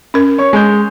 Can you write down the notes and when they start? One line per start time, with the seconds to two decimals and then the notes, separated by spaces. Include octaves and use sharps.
0.14 C#4 A#4
0.38 C#5 C#6
0.53 G#3 G6